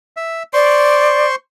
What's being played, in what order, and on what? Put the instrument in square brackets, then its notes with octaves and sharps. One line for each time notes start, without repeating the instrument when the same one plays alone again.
[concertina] E5
[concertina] C5 C6 C#6 [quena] D5